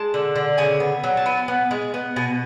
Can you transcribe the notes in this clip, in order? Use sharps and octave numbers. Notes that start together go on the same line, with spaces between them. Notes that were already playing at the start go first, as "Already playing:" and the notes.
Already playing: G#3 A5
D3
D3
C#3 G#5
B3
F#3
A5
B3 G#5
B3
G#3
B3
B2 G#5